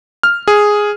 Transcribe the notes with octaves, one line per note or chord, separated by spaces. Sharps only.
F6
G#4